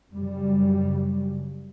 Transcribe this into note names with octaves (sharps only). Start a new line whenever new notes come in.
F#2 C#3 G3